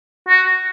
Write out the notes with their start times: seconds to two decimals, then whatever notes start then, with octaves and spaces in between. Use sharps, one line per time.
0.29 F#4